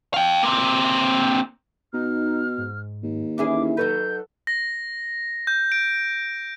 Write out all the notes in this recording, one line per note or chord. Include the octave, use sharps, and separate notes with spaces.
F5 G5
A#3 C4
B2 D#4 F6
G#2
D#2
E2 C#4 E4 G#4 D6
F#3 D#4 A4 B4 G6
A#6
G6
D7